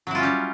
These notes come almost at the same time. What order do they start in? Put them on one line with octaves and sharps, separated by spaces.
F#3 E4 F4 C#4 G3